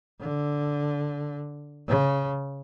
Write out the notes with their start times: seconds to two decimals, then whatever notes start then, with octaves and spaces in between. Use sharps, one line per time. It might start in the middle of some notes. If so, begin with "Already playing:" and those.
0.20 D3
1.88 C#3